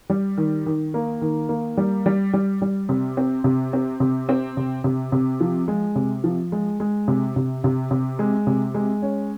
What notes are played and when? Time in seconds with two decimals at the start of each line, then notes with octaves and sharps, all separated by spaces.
0.10 G3
0.38 D#3
0.66 D#3
0.94 A#3
1.21 D#3
1.49 A#3
1.77 G3
2.06 G3
2.33 G3
2.62 G3
2.89 C3
3.17 C4
3.44 C3
3.73 C4
4.00 C3
4.29 C4
4.57 C3
4.84 C3
5.12 C3
5.40 F3
5.68 G#3
5.95 C3
6.24 F3
6.52 G#3
6.80 G#3
7.08 C3
7.36 C3
7.64 C3
7.91 C3
8.19 G#3
8.47 C3
8.75 G#3
9.02 C#4